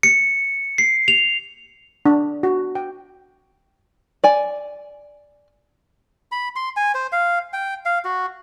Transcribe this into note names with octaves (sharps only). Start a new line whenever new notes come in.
C#7
C7
F7
D4
F#4
G5
D5 G#5
B5
C6
G#5
C5
F5
G5
F5
F#4